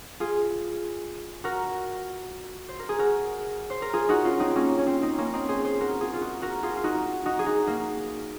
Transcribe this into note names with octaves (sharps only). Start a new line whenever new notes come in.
F4 G#4
F#4 A#4
C5
A#4
G#4
F#4 A#4
C5
A#4
F4 G#4
D#4 F#4
C#4 F4
C4 D#4
C4
A#3 C#4
C#4
C4
C4 D#4
A#3 C#4
C4 D#4
G#4 C5
G#4 C5
F#4 A#4
F4 G#4
F4
D#4 F#4
F#4 A#4
F4 G#4
F4
D#4 F#4
D#4 F#4
G#4
D#4 F#4
A#3